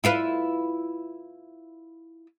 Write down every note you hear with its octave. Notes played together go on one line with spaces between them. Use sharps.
E4 F4 B4